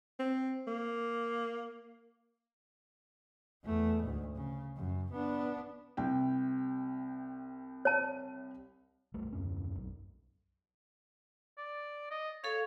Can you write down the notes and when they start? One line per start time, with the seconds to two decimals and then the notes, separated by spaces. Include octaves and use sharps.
0.19 C4
0.68 A#3
3.63 E2 A3
4.03 D2 G#2
4.35 C#3
4.76 F#2
5.12 B3 D4
5.97 C2 C3 G5
7.85 C#5 A5
9.14 B1 G3 A3
9.33 D#1 F#2 C#4
9.76 B1
11.58 D5
12.11 D#5
12.44 A4 C#5 F5